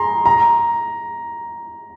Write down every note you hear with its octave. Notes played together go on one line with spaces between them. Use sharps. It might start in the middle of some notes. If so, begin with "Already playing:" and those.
Already playing: G#4 A#5 C6
A#5